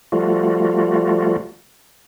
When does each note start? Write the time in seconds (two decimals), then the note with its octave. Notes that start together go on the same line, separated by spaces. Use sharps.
0.12 F3 G3 A3 F4 F#4